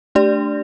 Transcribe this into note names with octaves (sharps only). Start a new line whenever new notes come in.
A3 D4 G4 D5